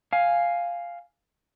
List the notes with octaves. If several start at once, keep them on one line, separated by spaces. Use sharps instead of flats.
F5 G#5